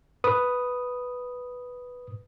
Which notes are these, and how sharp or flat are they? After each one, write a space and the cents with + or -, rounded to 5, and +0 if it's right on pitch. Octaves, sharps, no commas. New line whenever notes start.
B4 +0 D#6 +0